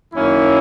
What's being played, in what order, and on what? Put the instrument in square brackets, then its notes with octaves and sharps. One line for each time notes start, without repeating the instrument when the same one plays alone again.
[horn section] F#2 D#3 A#3 C#4 E4